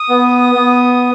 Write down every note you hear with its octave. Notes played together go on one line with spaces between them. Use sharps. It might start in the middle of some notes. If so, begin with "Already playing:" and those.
Already playing: D#6
B3
B3